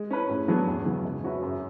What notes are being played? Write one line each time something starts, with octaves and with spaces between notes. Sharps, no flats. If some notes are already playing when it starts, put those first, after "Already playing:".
Already playing: G#3
C#4 E4 B4
A2
F#3 B3 D4 G#4
E2
C#3 F#3
G#3
C#4 F#4 B4 E5
F#2